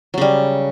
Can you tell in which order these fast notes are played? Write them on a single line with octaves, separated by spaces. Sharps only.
F#3 C#3 G3